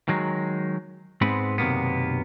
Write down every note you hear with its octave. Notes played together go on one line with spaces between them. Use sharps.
D#3 F#3 G#3
G#2 G#3 B3 C4 B5
B1 F#2 C3 D#3 A#3 B3